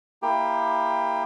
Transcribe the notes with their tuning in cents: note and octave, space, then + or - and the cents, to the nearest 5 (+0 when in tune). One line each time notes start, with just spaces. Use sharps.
A#3 +0 E4 +0 G4 +20